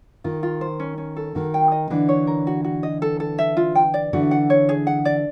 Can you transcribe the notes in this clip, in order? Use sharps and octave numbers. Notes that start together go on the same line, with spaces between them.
D#3 F4
F4
C5
C#4
C#4
A4
D#3 F#4
G5
D#5
D3 E3 D4
C#5
A#4
F#4
F#4
D#5
A4
A4
E5
F4
G5
D5
D3 E3 F#4
F#5
C#5
G#4
F#5
D5